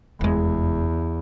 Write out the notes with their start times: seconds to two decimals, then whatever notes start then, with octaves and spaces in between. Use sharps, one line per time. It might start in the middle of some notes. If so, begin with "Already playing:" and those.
0.21 F1 E2 G#3